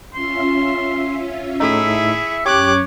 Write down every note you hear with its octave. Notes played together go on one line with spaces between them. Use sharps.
C#4 F4 E5 C6
A2 A3 D#4 E4 G#4 E5 C#7
F#2 C#4 G4 C#5 D6 F#6